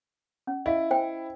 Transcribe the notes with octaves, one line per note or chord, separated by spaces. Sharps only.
C#4
E4 D#5 F5
C5 G5